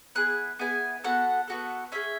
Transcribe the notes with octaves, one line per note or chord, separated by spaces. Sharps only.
B3 E4 G#4 F#6
B3 E4 G#4 G#5
B3 F#4 A4 F#5
B3 F#4 A4
C#4 G#4 E5